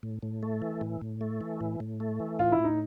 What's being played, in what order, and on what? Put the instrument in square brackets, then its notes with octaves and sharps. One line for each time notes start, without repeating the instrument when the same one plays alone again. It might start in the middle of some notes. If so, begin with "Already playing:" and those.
[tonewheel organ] A2
A2
A3
E3
A2
A2
A3
E3
A2
A2
A3
E3
[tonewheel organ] A2 [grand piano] F4
[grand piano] E4
[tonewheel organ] A2 [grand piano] D#4